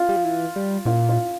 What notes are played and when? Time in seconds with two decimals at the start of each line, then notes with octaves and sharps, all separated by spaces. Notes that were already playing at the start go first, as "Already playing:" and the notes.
Already playing: F4
0.09 G3
0.16 F3
0.24 E3
0.56 G3
0.85 A#2 F4
1.09 F4